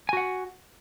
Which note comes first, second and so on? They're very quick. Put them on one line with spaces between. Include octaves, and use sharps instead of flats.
G#5 F#4 F#5